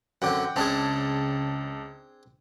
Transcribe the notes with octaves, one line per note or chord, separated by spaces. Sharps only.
F#2 D3 C4 F#5 G5 D6
C#2 C#3 C4 D4 G#4 A5